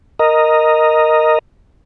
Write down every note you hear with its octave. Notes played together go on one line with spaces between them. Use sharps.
A#4 D#5